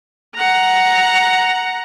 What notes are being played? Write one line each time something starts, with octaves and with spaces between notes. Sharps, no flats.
F#5 A#5